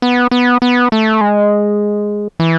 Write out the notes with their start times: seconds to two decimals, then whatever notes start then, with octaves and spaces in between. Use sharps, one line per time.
0.02 B3
0.31 B3
0.62 B3
0.92 A3
1.21 G#3
2.40 E3